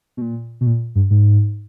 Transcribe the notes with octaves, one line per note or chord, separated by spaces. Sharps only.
B2
A#2
B2
A#2
G2
G#2